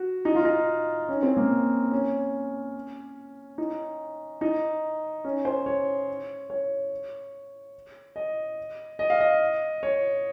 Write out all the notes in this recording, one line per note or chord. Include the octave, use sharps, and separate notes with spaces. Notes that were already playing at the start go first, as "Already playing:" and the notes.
Already playing: F#4
D#4
F4
D#4
C#4
C4
A#3
C#4
D#4
D#4
C#4
C5
C#5
C#5
D#5
D#5
F5
D#5
C#5